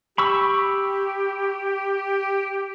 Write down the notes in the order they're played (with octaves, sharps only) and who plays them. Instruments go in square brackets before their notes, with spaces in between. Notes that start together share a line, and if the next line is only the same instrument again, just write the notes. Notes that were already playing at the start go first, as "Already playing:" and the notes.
[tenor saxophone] G4 [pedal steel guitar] B5 C#6 E6